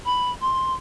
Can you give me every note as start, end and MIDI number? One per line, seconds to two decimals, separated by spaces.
0.05 0.30 83
0.41 0.72 84